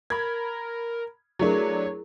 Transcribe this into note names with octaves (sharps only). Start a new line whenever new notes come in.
A#4 B5 G#6
F#3 A3 D4 E4 G#4 A#4 C#5